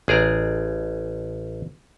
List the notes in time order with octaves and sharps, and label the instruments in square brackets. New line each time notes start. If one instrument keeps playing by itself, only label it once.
[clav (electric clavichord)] A1 G#4 D5 A#5